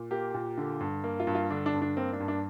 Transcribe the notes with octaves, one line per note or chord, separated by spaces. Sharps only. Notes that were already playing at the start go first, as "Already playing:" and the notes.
Already playing: A#2
A#3 G4
A#2
D3
G2
A#3
F4
G2
F4
D3 D4
D4
G2
D4
A#3 C4
D4
G2
D4